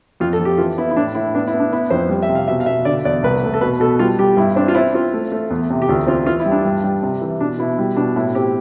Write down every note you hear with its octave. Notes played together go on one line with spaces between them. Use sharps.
F2 F4
A4
F2
G4
E3 F4
B3 E4
E4
A2 D4
A2 E4
B3 D4
E4
B3
D4
B3 E4
F2 C5
G3
E5
C3
F5
B2 E5
F5
B2 E5
D3 D5
E2 D5
C2 B4
A3
A4
B2 B4
B2 A4
G3 F4
G3 G4
G2 E4
C4 D4
F4
C4 E4
C4 F4
A3
A3
E2
C3
G4
D2 F4
C4 F4
E3 F4
E4
G3
D4
G2
G3
C3
E3
B2 D4
B2 E4
G3 E4
B2 D4
A2 E4
C4 G4